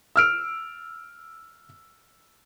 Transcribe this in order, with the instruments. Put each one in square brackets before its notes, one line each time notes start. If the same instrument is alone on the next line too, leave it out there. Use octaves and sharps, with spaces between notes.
[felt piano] E6 F6 D7